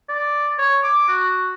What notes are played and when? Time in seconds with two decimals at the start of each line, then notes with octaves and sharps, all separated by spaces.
0.09 D5
0.58 C#5
0.83 D6
1.09 F#4